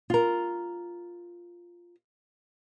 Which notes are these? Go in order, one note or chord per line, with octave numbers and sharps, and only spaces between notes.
F4 A#4